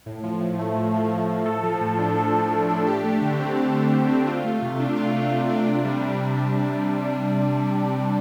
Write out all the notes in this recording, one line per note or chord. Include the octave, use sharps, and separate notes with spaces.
A2
F3
A2
A3
A2
F3
A2
A3
A4
F3
A2
D4
A4
F3
A2
D4
G4
A3
D3
C4
G4
A3
D3
C4
F4
A3
C3
D4
F4
A3
C3
D4
C3
G3
C3